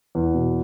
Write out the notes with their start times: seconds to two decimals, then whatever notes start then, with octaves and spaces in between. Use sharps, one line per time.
0.15 E2
0.34 B2